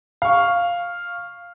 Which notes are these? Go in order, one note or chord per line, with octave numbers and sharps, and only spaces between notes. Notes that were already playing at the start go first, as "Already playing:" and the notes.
F5 C#6